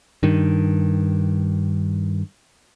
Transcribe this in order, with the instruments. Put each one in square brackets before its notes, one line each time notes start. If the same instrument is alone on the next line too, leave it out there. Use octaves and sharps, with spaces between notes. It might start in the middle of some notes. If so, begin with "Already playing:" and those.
[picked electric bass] G2 D#3